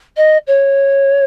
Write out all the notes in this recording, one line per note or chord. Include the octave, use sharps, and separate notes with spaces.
D#5
C#5